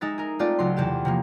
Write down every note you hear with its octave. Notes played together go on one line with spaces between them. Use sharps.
G#3 D#4 E5 A6
G#4 A#4
G#3 A3 C4 F4 D5
C#2 F#3 C6
E2 C3 G4 E7
C3 F3 A#3